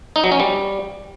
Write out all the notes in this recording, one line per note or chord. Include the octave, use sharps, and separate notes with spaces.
D#4
F#3
C#4
G3